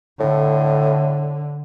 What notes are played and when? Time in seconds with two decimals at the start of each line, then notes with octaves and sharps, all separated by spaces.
0.20 A2 D3